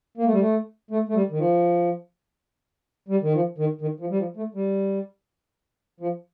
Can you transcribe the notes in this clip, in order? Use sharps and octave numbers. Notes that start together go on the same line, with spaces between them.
A#3
A3
G3
A3
A3
A3
G3
D#3
F3
G3
D#3
F3
D#3
D#3
F3
G3
F3
A3
G3
F3